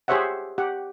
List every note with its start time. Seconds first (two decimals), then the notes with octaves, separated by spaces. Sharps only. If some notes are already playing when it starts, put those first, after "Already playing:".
0.08 G4 G#4 C5 C#5 E5 F#5
0.58 G4 F#5